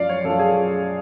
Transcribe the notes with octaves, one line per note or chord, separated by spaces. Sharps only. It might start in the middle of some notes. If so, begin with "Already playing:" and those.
Already playing: F#2 F3 D5 F5
C#5
F#2 F3 A4
G#4